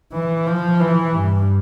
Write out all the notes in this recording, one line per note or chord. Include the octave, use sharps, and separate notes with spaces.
E3
F3
E3
G2